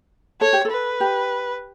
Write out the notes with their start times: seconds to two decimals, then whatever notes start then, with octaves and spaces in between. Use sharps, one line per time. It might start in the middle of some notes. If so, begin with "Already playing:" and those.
0.41 A4 C#5
0.53 G4
0.65 A4
0.71 B4
1.00 G4